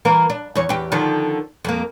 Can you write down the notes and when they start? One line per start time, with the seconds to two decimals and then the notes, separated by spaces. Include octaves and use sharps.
0.05 E3 A#3 A#4
0.30 D4
0.55 E2 C#5
0.69 E2 G4
0.92 D3 D#3 F3
1.65 F2 A#3